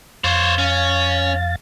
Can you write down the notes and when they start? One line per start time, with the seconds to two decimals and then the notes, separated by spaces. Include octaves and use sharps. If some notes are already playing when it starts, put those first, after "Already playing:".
0.24 F2 C5 C#5 F5 A6
0.58 C#4